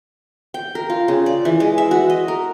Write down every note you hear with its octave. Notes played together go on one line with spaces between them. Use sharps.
G5
A#4
F4
C#3
D5
E3
G#3
E5
F#4
D#5
A#4